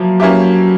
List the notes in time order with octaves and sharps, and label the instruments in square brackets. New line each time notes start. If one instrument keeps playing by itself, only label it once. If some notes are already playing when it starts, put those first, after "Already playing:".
Already playing: [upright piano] F3 A#3 E4 [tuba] F#3
[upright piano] A#3 C#4 E4 G4